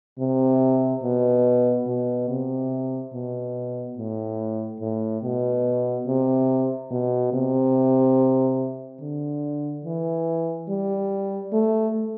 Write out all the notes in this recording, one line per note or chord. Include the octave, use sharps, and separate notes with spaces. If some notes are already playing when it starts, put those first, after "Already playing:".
C3
B2
B2
C3
B2
A2
A2
B2
C3
B2
C3
D3
E3
G3
A3